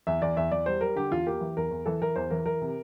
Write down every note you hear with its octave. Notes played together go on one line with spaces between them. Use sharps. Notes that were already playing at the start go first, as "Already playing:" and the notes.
E2 E5
E2 D5
E2 E5
E2 D5
G3 C5
G3 A#4
D3 G4
E2 F4
A#3 G4
E3
E2 A#4
E2
E3 A4
E3 A#4
E2 C5
E3 A#4
E3 A#4
C3